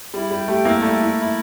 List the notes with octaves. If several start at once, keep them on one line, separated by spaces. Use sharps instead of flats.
G3 E4
G3 G4
A3 G4
A#3 E4
G3 A3
E4
E4